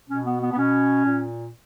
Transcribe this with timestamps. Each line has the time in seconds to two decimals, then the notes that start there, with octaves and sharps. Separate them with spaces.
0.08 B2 C#4
0.25 B3
0.41 B3
0.52 B3
0.57 B2 C#4
1.05 A#2